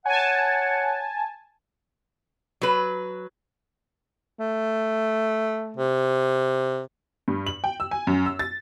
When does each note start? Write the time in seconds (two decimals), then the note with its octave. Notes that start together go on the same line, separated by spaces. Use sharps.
0.06 C#5 F#5 G#5 A5
2.61 F#3 B4
4.39 A3
5.76 C3
7.28 G2
7.47 F#7
7.64 G5
7.80 E6
7.91 G#5
8.07 F#2
8.26 E6
8.39 A6